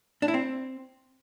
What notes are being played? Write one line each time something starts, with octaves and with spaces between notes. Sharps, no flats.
D4
E4
C4